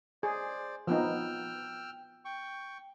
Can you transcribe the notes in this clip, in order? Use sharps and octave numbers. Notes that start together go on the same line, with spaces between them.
G#4 C5 D5
F3 B3 D#4 G5 E6 F6
G5 C#6